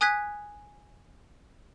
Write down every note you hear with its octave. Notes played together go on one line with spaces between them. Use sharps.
G#5 D#6 F#6 G#6 B6